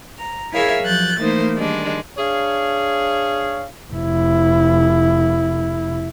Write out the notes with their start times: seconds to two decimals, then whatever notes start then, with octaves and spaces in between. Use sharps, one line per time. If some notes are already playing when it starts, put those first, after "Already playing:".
0.18 A#5
0.52 E4 G#4 A#4 C#5 E5 F5
0.83 F3 F#3 F#6 G6 A6
1.19 E3 A3 A#3 D#4 C5
1.56 D#3 G3 G#3 D4
2.18 D4 G#4 C#5 F5
3.92 F1 E4